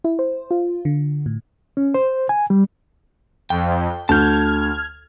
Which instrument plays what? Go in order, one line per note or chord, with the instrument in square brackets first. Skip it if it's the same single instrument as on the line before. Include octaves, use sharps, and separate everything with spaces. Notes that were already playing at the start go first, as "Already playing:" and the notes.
[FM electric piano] E4
C5
F4
D3
A2
[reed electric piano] C#4
C5
G#5
G3
[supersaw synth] F2 [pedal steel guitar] G5
[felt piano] D2 [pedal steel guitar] A5 G6 [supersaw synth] F6 G#6